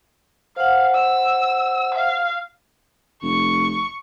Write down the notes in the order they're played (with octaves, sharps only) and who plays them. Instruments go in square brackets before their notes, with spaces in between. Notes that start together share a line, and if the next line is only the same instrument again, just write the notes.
[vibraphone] C5 F#5 [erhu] F5
[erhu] E6
F5
[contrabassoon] F1 [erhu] C#6